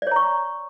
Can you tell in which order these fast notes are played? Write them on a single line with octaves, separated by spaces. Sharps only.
D5 C#5 A#5 C#6